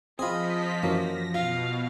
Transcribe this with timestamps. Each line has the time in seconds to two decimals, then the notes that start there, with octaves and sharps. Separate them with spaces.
0.19 F3 C4 F4 G#4 D#5 B5 B6
0.83 F#2 E3 F#3 A#3 A#6
1.35 B2 F4 F5